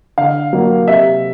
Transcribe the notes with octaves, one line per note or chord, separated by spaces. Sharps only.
D3 F5
F#3 A#3
C3 E5